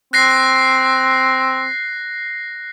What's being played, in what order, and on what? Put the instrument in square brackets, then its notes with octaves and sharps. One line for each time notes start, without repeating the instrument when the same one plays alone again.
[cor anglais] C4 [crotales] F#6 A#6 C7